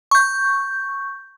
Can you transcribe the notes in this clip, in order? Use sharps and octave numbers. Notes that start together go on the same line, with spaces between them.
C#6 G6